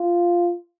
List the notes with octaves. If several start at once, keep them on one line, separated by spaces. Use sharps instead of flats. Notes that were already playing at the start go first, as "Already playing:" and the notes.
Already playing: F4